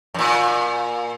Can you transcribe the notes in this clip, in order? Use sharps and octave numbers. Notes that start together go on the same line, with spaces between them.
F#2 A#2